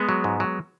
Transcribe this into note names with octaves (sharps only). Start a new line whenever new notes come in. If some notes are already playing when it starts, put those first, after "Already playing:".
Already playing: G#3 B3
F#3
G#2
F#3